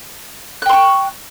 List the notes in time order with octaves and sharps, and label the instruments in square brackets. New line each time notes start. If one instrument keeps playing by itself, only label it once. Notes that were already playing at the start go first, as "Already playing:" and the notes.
[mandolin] F#6
G5
C6
C#6